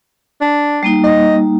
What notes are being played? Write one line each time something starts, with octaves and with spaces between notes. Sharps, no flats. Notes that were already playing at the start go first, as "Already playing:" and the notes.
D4
G3 A#3 D#4
D#5